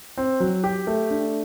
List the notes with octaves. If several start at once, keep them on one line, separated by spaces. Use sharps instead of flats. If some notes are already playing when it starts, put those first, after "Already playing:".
C4
F#3
G4
A3
D4